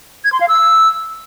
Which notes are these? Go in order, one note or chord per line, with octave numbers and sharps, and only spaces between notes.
G#6
C6
F5
E6